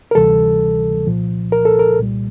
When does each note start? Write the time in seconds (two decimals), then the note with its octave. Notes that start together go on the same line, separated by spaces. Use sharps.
0.11 A#4
0.15 D2 C3 E3 G3 A4
1.06 C2 A#2 F3
1.52 A#4
1.65 A4
1.79 A#4
1.98 C2 A#2 G3